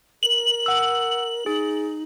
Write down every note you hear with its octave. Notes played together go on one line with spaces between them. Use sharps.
A#4 F#7
F#5 E6
D#4 G#4